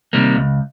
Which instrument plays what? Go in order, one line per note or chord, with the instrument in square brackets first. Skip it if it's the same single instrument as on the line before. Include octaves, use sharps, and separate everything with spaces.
[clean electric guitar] C3 D#3 G3 A#3
C#2